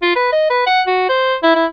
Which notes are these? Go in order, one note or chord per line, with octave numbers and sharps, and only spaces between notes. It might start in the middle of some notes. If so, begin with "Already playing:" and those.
F4
B4
D#5
B4
F#5
F#4
C5
E4
E4